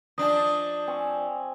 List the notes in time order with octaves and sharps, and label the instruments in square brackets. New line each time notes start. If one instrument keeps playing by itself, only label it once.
[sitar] F3 D4 [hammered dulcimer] D#5 A5
[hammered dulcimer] C4 G#5 C#6